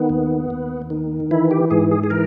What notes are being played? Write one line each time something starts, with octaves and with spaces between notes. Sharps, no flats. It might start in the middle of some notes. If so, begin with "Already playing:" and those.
Already playing: D#3 B3
D#2
D#2
D#3
E3 E4
G4
G#2 G#4
G#4
G#4
E3 A#4